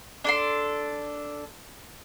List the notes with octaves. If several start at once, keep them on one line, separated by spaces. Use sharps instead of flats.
D4 A4 C6